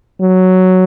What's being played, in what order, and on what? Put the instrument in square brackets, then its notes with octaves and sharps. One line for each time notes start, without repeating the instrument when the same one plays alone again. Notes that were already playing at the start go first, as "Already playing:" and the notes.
[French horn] F#3